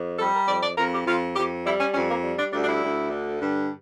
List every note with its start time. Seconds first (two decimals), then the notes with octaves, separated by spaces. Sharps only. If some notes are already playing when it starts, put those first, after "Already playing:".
Already playing: F2
0.19 G3 A4
0.33 A#4
0.47 F2 D5
0.62 D5
0.77 F2 A#4
0.92 G4
1.06 F2 F4
1.35 F2 G4
1.64 G3 E4
1.80 C#4
1.94 F2 C#4
2.09 A#3
2.23 G3
2.37 D4
2.52 D2 D4
2.63 D4
2.67 E4
2.81 D2
3.11 D3
3.40 G2